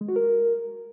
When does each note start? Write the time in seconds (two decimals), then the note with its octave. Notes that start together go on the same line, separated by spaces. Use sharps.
0.01 G#3
0.08 F#4
0.16 A#4